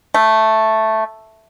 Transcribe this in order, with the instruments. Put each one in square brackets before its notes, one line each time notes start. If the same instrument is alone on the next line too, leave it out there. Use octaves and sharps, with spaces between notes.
[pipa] A3